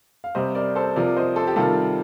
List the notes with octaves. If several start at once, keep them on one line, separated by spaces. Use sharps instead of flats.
F5
C3 G3 C5 D#5
A#4 D5
A4 C5
C3 F3 A#4 D5
C5 D#5
A4 C5
G4
C3 D#3 G3 F4 A4